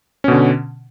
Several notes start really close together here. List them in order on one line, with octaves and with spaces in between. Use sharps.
C#4 B2 D3